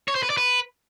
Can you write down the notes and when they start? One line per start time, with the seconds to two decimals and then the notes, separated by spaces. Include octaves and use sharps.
0.08 C#5
0.15 C5
0.23 B4
0.30 D5
0.37 B4